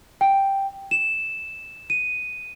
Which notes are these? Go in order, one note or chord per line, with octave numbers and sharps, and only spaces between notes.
G5
E7
D#7